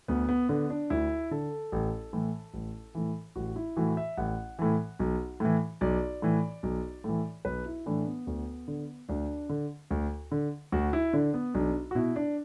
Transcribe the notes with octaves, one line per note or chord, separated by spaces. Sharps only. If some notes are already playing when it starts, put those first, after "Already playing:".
D2 B3
B3
D3 B3
D4
D2 E4
D3 A4
A1
A2 E3
A1
A2 E3
A1 F#4
E4
A2 E3 F#4
E5
A1 F#5
A2 E3
B1
A2 E3
B1 D5
A2 E3
B1
A2 E3
B1 B4
E4
A2 E3 D4
B3
D2
D3
D2 D4
D3
D2
D3
D2 F#4
E4
D3 D4
B3
B1 D4
F#4
B2 E4
D4